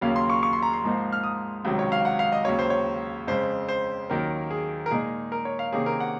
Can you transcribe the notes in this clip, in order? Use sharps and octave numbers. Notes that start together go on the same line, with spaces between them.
D#2 C#3 F#3 A#3 C#4 F5
C6
C#6
C#6
C6
A#5
C6
G#2 F3 A#3 D#4
F6
D#6
C#2 C3 D#3 F#3
C#5
F5
F#5
F5
D#5
D#2 C#3 F#3 C#5
C5
C#5
F2 C#3 G#3 C5
C5
D#2 D#3 F#3 A#3 C#4 A#4
G#4
A#4
A#2 G#3 D#4 G#4
A#4
C#5
F5
C3 D#3 A#3 C#4 G#4
A#4
F#5